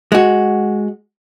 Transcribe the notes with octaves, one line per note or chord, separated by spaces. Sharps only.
G#3 F#4